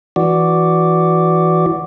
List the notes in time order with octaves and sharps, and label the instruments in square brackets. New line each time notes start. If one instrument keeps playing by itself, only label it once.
[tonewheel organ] E3 F#4 D5